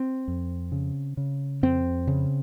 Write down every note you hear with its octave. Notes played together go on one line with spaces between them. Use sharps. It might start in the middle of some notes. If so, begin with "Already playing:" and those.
Already playing: C4
F2
C#3
C#3
F2 C4
C#3